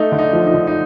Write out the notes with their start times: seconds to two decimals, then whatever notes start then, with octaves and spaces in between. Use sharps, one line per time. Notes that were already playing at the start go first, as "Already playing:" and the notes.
Already playing: A3 D#4
0.12 D3
0.19 D#4
0.33 F3
0.47 D#4
0.54 D3
0.67 D#4